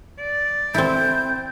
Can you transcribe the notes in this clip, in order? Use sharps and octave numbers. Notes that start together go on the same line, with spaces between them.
D5
C4 E4 G6